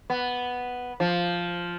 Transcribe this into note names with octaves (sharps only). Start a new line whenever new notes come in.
B3
F3